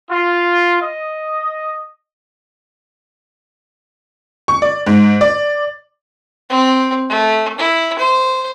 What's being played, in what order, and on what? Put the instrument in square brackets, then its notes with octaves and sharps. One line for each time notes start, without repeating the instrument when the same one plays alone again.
[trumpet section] F4
D#5
[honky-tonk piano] C#6
D5
G#2
D5
[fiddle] C4
A3
E4
C5